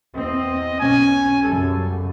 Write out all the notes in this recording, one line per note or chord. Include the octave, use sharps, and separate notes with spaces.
E2 C4 D#5
B1 B2 C#4 G#5
F#2 C#3 G3 A4